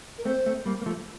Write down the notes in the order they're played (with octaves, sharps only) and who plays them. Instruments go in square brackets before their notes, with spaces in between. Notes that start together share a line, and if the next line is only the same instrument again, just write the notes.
[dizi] A#4
[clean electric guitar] A3 C4 [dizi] C5
[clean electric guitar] A3 C4
G3 A#3
A#3
F3 A3